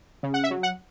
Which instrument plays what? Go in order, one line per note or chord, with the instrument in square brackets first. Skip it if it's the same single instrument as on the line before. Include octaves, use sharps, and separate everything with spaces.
[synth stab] C#3
F#5
E5
F#3
F#5